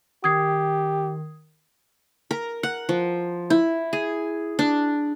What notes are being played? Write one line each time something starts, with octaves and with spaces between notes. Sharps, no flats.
D#3 G4 D#6 G#6 C7
A#4
F#5
F3
E4
G#4
D4